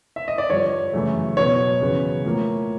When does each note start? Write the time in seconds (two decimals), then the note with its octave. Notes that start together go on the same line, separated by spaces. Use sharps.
0.16 E5
0.28 D#5
0.38 D5
0.50 G2 D3 F3 C#5
0.93 F#2 C#3 E3 A3
1.37 B2 F#3 B3 C#5
1.81 E2 C#3 F#3 B3
2.24 A2 F3 A#3